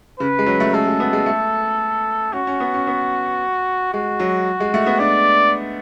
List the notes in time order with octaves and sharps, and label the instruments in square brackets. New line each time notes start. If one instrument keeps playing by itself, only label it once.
[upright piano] C#3 [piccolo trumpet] B4
[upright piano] G#3
F#3
A3
[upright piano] G#3 [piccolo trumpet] A4
[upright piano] G#3
B3
G#3
A3
[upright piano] C#4 [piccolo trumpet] F#4
[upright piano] C#4
B3
C#4
B3
[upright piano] G#3 [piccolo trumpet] F#4
[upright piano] F#3
G#3
A3
B3
[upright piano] D4 [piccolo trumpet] D5